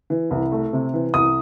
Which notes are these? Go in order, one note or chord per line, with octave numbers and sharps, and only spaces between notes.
E3
C2
A3
C3
E3
C2 D#6